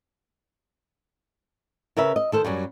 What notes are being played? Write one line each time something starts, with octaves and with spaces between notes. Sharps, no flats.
C#3 A#4 B4 E5
D#5
D#3 A4 C5
F#2 F#3 G3